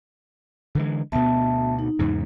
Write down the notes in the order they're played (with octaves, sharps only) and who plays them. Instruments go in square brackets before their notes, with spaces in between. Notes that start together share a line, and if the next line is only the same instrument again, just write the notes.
[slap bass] D3 E3 G#3
[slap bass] D2 B2 [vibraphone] B3 E5 A5
[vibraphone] D#4
[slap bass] E2 G#2 C#3